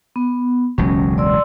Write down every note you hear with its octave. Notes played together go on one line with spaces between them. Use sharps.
B3
E1 C#2 F#3 C#4
D5 C6 E6